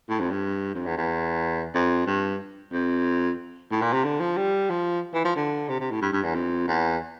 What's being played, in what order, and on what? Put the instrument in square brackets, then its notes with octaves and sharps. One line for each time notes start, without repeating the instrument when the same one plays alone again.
[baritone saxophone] A2
F2
G2
F2
E2
E2
F2
G2
F2
A2
A#2
C3
D3
F3
G3
F3
E3
F3
D3
C3
C3
A2
G2
G2
E2
F2
E2